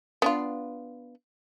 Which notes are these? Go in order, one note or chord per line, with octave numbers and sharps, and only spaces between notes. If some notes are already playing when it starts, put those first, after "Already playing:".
B3 D4 F4